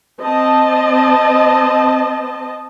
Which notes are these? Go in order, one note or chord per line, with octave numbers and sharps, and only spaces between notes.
C4 D#5 A5